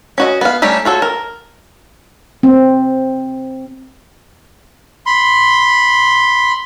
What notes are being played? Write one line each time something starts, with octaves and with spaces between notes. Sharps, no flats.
C#4 F#4 D#5
B3 F5
G3 A3 C#4 G4 A#5
F4 F#4 A4 C#5
A#4
C4
B5 C6